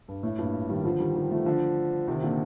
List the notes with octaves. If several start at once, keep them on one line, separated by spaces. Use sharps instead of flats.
G2
A2
G2 A#2
D#3 G3
D3 F3
D#3 G3
D#3 G3
F3 A3
D3 F3
C3 D#3
A#2 D3